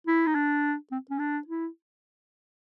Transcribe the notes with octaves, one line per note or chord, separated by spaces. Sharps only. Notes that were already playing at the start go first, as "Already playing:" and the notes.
E4
D#4
D4
C4
C#4
D4
E4